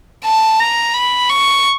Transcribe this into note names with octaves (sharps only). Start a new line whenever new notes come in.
A5
A#5
B5
C#6